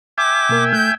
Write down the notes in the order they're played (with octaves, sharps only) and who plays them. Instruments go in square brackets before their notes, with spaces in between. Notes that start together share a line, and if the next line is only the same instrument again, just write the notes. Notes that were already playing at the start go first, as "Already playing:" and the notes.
[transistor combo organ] E5 G5 G#5 [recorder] D6
[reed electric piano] B2 A#3 A#4
[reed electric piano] A3 F#6 [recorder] G6